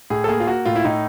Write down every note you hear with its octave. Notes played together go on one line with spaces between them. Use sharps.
A2 G#4
A4
A#3 G#4
F4
A#3 F#4
A2 F4
E4
A2 D#4